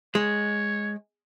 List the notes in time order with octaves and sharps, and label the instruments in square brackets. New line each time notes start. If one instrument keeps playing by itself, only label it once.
[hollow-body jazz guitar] G#3 [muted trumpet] C#5